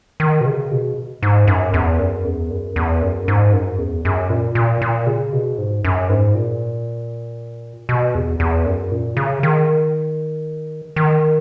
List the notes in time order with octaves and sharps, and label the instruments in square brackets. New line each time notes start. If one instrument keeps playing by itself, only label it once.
[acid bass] D#3
B2
C#3
B2
G#2
F#2
E2
F#2
E2
F#2
E2
F#2
G#2
F#2
E2
F#2
A#2
A#2
A#2
C#3
B2
G#2
F#2
G#2
A#2
B2
E2
E2
F#2
A#2
C#3
D#3
D#3